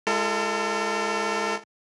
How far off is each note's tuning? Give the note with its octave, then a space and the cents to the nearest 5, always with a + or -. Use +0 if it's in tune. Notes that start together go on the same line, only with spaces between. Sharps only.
G#3 +0 F4 -40 A4 +35